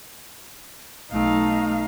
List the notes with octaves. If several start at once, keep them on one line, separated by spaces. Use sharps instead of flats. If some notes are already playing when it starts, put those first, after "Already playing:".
B1 A3 D#4 F5